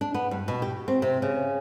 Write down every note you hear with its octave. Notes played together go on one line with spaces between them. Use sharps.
D4
B3
G2
B2
G4
C4
C3
C#3